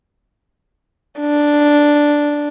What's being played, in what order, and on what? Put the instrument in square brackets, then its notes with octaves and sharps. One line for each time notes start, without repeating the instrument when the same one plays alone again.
[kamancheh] D4